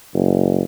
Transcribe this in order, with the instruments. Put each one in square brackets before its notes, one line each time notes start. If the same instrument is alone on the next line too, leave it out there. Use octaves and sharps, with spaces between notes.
[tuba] F#1